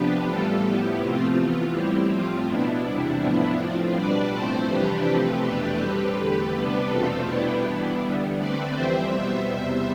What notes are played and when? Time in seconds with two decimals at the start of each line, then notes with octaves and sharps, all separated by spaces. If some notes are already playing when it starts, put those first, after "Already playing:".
Already playing: C3 F3 B3 D4 G4 B4
0.26 A2 E3 G3 F4 A4
0.63 A2 F3 B3 E4 G4
1.00 C3 F3 A3 C4 F4
1.37 C3 E3 B3
1.73 A2 G3 C4 E4 G4
2.10 A2 F3 C4 F4
2.47 B2 B3 D4 E4
2.84 E2 C3 G3 D4 E4
3.21 A2 F3 B3 D4
3.58 A2 F3 C4 F4
3.94 B2 G3 D4 B4 D5
4.31 A2 F3 A3 C4 A4 C5
4.68 F2 C3 E3 G3 D4 G4 B4
5.06 C3 F3 A3 C4
5.42 E2 B2 A3 D4 G4 B4
5.79 A2 G3 C4
6.16 E2 D3 A3 G4 B4
6.53 C3 G3 B3 D4
6.89 E2 B2 A3 C4 F4 A4
7.26 B2 G3 B3 D4 E4 G4
7.63 G2 E3 B3 D4 E4
8.00 D3 G3 B3
8.37 D3 A3 C4 B4 D5
8.74 F2 E3 G3 C4 C5 E5
9.11 B2 G3 B3 C5 E5
9.48 E2 C3 G3